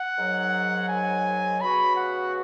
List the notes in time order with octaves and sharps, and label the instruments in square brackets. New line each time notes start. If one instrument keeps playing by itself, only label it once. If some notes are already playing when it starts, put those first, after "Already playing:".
Already playing: [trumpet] F#5
[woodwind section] G#2 D#3 F#3
[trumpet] G#5
[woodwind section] C#3 B3 F#4 [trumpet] B5
[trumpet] F#5